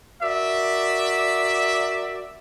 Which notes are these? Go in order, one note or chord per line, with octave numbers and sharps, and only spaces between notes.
F#4 A#4 D5 E5